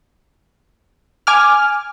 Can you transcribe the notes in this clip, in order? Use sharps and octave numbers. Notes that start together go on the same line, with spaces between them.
G#5 D6 F6